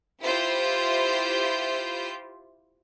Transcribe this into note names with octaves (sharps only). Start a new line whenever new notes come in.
E4 F4 G4 C5 G6